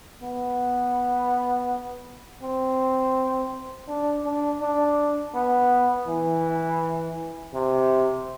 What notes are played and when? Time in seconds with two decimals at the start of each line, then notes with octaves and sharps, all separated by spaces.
0.23 B3
2.43 C4
3.88 D4
4.24 D4
4.61 D4
5.34 B3
6.08 E3
7.54 C3